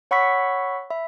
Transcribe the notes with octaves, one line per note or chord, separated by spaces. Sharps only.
C#5 F#5 B5 C#6 E6 B6
E5 B5